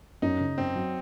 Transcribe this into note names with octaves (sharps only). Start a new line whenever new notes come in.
F#2 D#4
C#3
F#2 C4
F#3